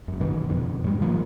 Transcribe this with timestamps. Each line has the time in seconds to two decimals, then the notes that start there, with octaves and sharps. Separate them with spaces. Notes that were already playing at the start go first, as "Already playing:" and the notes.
0.08 F#1 F#2
0.20 F#2 B2 D#3 E3
0.49 F2 B2 D3
0.84 G#2 G3
1.00 D#3 F3 A#3